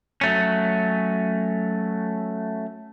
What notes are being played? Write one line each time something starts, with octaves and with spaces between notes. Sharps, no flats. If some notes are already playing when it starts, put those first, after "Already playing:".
F#3 A3 C#4